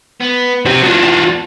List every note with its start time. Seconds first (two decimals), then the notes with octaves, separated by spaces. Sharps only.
0.21 B3
0.66 F#3 F#4 G4 C5
0.83 E2 D4 F4 F#4